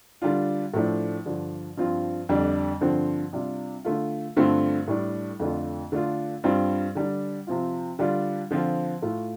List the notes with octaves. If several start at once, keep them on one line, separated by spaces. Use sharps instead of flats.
D3 G3 D4 F4
A2 F3 A3 D4
G2 D3 F3 D4
G2 F3 C4 F4
F2 D3 G3 D4
G2 D3 F3 C4
C3 G3 D4 F4
D3 A3 F4
G2 D3 A3 C4 F4
A2 G3 D4
F2 D3 A3 D4 F4
D3 A3 D4 F4
G2 G3 C4 F4
D3 G3 D4
C3 F3 C4 F4
D3 G3 D4 F4
D3 F3 C4 F4
A2 A3 F4